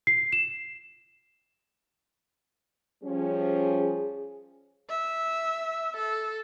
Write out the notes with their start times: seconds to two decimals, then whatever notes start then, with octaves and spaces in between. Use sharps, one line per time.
0.07 C7
0.32 E7
3.03 F3 G3 C#4 G#4
4.89 E5
5.97 A4